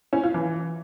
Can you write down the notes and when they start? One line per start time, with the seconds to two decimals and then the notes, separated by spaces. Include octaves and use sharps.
0.13 C#4
0.23 F4
0.34 E3